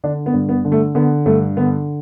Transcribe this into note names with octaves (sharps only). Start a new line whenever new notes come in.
D3 D4
B3
G2
B3
D3
A3
D3 B3
G2 A3
D3 B3